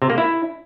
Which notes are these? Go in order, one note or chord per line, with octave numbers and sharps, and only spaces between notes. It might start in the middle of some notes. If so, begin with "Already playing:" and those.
C3
A#3
E4